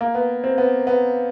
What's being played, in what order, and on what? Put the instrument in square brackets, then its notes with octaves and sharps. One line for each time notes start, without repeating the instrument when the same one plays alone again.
[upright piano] A#3
B3
C4
B3
B3